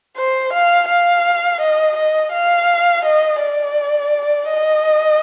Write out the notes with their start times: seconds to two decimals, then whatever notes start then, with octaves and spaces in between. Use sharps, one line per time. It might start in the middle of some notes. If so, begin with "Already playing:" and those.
0.17 C5
0.53 F5
0.89 F5
1.61 D#5
1.97 D#5
2.33 F5
3.05 D#5
3.41 D5
4.50 D#5